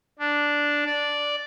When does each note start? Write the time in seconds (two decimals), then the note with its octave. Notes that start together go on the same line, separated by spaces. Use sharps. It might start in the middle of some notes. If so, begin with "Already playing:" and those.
0.19 D4
0.86 D5